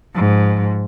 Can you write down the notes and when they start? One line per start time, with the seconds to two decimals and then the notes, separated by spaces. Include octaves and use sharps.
0.14 G#2 F3